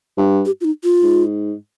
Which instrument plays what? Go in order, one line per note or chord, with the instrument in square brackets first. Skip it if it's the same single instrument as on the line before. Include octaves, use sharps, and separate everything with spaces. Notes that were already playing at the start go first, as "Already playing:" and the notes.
[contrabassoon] G2
[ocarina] G4
F4
D#4
F4
[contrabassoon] G#2